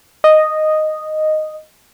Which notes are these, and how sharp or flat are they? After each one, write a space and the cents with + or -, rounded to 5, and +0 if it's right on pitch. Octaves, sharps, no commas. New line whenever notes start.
D#5 -5